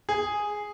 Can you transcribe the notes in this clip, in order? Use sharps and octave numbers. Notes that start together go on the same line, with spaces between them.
G#4